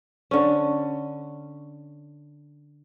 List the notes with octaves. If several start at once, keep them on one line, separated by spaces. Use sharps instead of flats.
D3 C#4